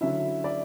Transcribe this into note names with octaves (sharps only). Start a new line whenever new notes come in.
D3 F#3 C#4 E4 E5
D5